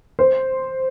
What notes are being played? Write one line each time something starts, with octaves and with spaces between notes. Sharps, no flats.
C5